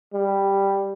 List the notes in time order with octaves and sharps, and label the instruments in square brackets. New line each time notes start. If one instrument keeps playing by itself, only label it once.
[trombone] G3